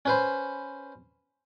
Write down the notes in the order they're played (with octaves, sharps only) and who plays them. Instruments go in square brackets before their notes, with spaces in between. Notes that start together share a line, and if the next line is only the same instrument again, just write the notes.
[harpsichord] C#4 B4 C5